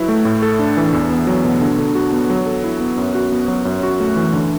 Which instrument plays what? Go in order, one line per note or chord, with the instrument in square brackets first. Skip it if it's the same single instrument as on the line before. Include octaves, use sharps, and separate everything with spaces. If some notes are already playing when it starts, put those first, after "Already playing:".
Already playing: [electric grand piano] F#3 E4 B4
A3
A2
A4
D4
E3
E2
B3
F#3
B2
D3
D3
F#4
B3
F#3
A4
E4
B3
F#2
F#4
B3
F#3
F#2
F#4
A3
E3
D3